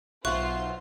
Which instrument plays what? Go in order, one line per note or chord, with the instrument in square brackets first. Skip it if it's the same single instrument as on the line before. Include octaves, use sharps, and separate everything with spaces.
[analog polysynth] B1 [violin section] F4 C5 C6 [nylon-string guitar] E5 F#5 [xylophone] C#6 F#6